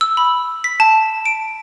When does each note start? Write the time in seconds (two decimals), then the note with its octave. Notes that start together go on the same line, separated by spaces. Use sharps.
0.01 E6
0.17 B5
0.64 B6
0.80 A5
1.26 D7